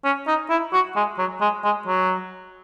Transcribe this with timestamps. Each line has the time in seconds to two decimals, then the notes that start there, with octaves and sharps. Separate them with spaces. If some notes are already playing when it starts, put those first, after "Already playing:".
0.04 C#4
0.27 D#4
0.50 E4
0.73 F#4
0.96 G#3
1.18 F#3
1.41 G#3
1.64 G#3
1.87 F#3